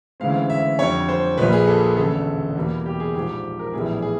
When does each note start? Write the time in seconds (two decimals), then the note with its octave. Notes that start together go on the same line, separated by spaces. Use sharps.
0.20 D2 C#3 E3 G#3 C4 F5
0.30 F5
0.50 E5
0.79 F2 D3 G3 C#5
1.09 C5
1.38 A#1 A#2 G3 A#3 B4
1.53 G#4
1.67 A4
1.96 E1 D2 C#3 A4
2.55 E2 B2 G3 A#3
2.86 G4
3.00 G#4
3.15 A#1 G#2 F3 G4
3.59 A#4
3.73 A#1 A2 E3 G3 B3 G#4
4.02 G#4